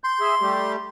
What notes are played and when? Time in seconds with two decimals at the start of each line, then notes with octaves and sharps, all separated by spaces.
0.04 C6 G6
0.20 G#4 E5
0.41 G3 A3 G4